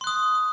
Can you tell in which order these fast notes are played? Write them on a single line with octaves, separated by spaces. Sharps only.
C6 F#6 D#6